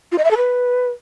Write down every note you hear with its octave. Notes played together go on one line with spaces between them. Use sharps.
F4
D#5
E5
A4
B4